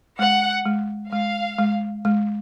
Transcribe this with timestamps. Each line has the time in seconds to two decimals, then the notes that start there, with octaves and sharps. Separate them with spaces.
0.19 G#3 F#5
0.66 G#3
1.11 G#3 F5
1.59 G#3
2.05 G#3